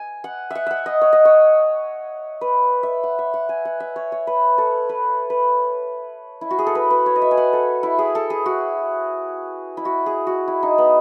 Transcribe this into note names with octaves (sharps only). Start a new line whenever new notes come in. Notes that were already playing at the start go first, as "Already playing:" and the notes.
Already playing: G#5
F#5
E5 F#5
E5 F#5
D#5
C#5
D#5
C#5
B4
E5
F#5
E5
F#5
G#5
F#5
E5
C#5
C#5
B4
A4
B4
B4
E4
F#4
G#4
A4
B4
B4
C#5
D#5
E5
G#5
F#5
A4
E4
G#4
A4
G#4
F#4
E4
F#4
G#4
F#4
E4
D#4
B3